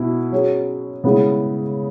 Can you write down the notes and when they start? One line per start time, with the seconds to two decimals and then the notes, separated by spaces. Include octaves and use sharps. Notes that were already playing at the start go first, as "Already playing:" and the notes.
Already playing: B2 B3 E4
0.32 F#3 C#4 G#4
1.04 C#3 G#3 B3 E4 G#4